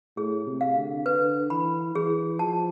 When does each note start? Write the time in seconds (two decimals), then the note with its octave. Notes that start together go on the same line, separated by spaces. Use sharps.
0.17 A2 G#4
0.47 C3
0.61 F5
0.76 D3
1.06 D3 B4
1.50 E3 B5
1.95 E3 G#4
2.39 F3 A5